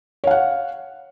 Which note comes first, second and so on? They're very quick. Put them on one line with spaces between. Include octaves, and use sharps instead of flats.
C#5 F5 F#5